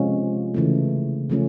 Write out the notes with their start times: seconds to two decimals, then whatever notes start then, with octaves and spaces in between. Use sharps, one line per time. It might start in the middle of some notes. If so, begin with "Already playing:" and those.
Already playing: C3 F3 G#3 C#4 F4
0.54 C#3 E3 A3
1.30 C#3 F3 A3 C#4